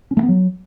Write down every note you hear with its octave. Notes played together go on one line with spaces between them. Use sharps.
C#4
A3
B3
F#3